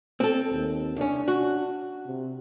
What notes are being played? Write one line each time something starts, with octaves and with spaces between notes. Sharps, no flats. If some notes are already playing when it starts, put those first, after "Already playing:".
C4 A4
D#2
C2 C#4 D4
F#4
C3